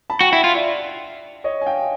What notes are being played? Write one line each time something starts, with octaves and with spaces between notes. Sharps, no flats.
A5 B5
F#4 G5
E4 E5 F#5
F4
D5 E5
C#5 D#5
G#5
F5 G5